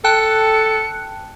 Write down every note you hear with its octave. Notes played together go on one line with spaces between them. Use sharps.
A4 G5 A5 F#6 C#7